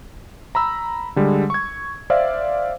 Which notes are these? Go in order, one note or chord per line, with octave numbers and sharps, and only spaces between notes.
A#5 B5 E6
D3 G3 G#3
C#6 G#6
C5 D5 E5 F5